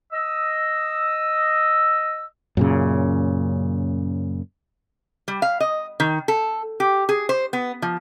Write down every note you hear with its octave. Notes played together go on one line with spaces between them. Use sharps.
D#5 E6
F#2 A#2 C#3
G3
F5
D#5
D#3
A4
G4
G#4
C5
B3
F3